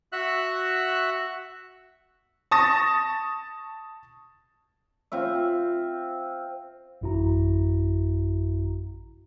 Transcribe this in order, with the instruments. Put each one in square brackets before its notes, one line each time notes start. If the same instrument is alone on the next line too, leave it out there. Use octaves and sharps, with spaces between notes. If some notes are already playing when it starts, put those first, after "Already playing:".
[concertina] F#4 E5 F#6
[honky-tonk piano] A5 C#6 D#6 A6 A#6
[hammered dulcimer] C4 F4 E5
[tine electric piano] A1 F#2 E4 F#4 A#5